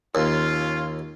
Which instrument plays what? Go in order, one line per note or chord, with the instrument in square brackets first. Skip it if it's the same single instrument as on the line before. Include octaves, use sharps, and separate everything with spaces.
[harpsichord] D#2 [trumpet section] C#4 F4